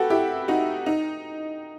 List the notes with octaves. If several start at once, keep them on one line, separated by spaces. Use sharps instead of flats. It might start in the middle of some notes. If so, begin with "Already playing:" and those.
Already playing: F#4 G4 A4 B4
E4 G4
D#4 F#4
D#4